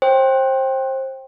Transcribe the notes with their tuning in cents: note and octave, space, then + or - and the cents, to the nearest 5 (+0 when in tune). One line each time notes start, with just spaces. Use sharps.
C5 +25 G5 +0